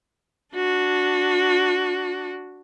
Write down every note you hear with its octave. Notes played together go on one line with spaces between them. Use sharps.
D4 F#4